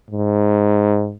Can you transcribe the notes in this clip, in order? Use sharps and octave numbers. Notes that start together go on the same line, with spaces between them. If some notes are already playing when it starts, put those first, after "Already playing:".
G#2